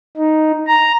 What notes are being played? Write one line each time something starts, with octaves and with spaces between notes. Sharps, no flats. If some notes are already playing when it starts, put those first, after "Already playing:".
D#4
A#5